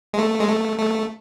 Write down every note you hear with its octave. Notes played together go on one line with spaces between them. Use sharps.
G#3
A3
G#3
A3
A3